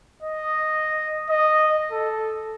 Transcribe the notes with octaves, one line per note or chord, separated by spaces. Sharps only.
D#5
D#5
A4